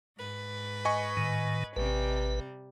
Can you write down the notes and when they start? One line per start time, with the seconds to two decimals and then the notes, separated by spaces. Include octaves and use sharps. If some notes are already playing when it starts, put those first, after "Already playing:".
0.17 G#2 B4
0.85 D#5 G#5 C#6
1.17 A2 D#3
1.76 A1 C3 G3 B4